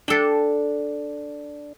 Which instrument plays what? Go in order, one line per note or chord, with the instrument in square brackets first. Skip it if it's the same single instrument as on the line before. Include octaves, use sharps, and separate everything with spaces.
[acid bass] D4 [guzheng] A4 G5